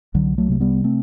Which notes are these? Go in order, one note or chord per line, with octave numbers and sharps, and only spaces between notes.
C2 D3 F#3
F#3 A3
C3 A3
G3 B3
A3 C4